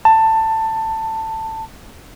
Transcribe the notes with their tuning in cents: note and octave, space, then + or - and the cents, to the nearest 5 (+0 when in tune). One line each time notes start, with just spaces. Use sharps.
A5 +15